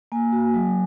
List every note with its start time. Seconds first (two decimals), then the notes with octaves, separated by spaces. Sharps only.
0.12 A#3 G#5
0.33 F#4
0.54 F#3